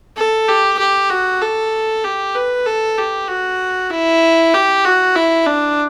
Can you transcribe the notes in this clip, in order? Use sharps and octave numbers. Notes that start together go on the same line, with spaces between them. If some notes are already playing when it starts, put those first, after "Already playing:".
A4
G4
G4
F#4
A4
G4
B4
A4
G4
F#4
E4
G4
F#4
E4
D4